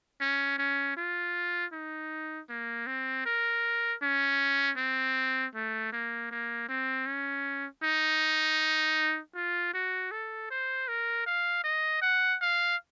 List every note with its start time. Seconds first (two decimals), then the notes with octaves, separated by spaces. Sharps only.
0.21 C#4
0.59 C#4
0.97 F4
1.73 D#4
2.50 A#3
2.87 C4
3.26 A#4
4.03 C#4
4.78 C4
5.55 A3
5.93 A#3
6.31 A#3
6.69 C4
7.06 C#4
7.84 D#4
9.35 F4
9.74 F#4
10.12 A4
10.51 C5
10.88 A#4
11.27 F5
11.64 D#5
12.02 F#5
12.41 F5